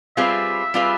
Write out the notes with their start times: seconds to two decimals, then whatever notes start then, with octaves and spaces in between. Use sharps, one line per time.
0.17 G3 C4 F4 G#4 B4 E5
0.74 G3 C4 F4 G#4 B4